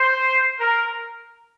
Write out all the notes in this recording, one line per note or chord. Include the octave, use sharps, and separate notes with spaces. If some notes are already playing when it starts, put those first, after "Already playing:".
Already playing: C5
A#4